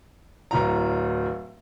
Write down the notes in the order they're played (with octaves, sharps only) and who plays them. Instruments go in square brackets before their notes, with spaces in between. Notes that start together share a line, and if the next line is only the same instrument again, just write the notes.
[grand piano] D1 A2 A#5